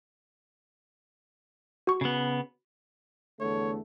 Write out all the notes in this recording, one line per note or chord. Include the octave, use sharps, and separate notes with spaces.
F#4 C#6
C#3 B3
E2 D3 A3 C#5